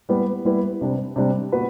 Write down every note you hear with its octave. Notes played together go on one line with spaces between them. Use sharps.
G3 B3 E4 B4
G3 B3 E4 B4
C3 G3 D4
C3 G3 D4
B3 F#4 B4